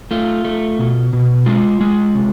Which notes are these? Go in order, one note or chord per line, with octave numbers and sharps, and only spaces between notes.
A3 F4
A3
B2
B2
G#3 F4
G#3
C3